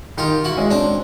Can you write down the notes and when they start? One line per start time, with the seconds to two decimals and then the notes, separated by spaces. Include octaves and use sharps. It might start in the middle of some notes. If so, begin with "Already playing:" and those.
0.18 D#3 F4 G4
0.44 E4 F#4
0.57 G#3 C#4
0.70 C4 D4